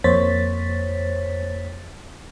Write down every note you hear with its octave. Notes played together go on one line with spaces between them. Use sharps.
F2 A#3 C5 C#5 A6 B6